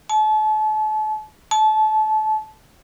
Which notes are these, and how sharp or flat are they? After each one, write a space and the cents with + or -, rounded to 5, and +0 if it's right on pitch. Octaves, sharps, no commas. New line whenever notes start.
A5 -35
A5 -25